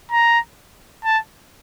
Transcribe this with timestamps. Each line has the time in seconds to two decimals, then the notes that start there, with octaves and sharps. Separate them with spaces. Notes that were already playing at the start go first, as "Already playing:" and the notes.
0.11 A#5
1.04 A5